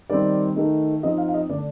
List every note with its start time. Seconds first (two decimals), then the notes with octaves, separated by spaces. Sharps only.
0.10 D#3 G3 C4 D5
0.56 D#3 A3 D#4
1.03 F3 C4 D#4 D#5
1.18 F5
1.28 F5
1.34 D#5
1.49 D3 A3 D4 D5